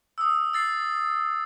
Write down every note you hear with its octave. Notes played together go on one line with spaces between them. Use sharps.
D#6 E6
E6 A6 C7